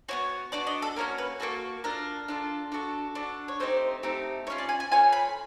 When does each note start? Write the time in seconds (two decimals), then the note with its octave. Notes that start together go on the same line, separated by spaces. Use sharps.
0.09 B3 D4 F#4 C#5
0.52 B3 D4 F#4 D5
0.67 D#5
0.82 A4
0.96 A#3 C#4 F#4 A#4
1.18 B4
1.40 A#3 C#4 F#4 A4
1.84 D4 F4 A4 A#4
2.28 D4 F4 A4
2.72 D4 F#4 A4
3.15 D4 F#4 A4
3.48 C#5
3.60 A3 C4 D#4 G4 C5
4.03 A3 C4 D#4 G4
4.47 A3 C#5
4.50 C#4 F4
4.58 D5
4.69 G#5
4.80 G#5
4.92 A3 C#4 F4 G#5
5.13 B5